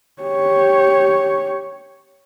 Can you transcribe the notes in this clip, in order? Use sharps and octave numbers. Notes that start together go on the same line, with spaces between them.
G4 C#5